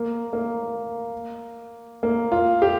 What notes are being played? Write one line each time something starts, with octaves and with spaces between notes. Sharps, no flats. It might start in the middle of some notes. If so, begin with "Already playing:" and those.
Already playing: A#3
A#3
A#3
F4
G4